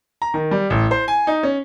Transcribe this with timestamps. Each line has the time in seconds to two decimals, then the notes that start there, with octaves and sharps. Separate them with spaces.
0.22 A#5
0.34 D#3
0.51 G3
0.70 A1
0.91 C5
1.08 G#5
1.27 D#4
1.43 C#4